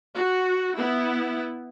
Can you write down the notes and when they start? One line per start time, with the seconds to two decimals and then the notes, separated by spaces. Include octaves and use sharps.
0.15 F#4
0.76 B3 E4